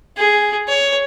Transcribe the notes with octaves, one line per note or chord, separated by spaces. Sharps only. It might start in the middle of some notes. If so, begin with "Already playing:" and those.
G#4
C#5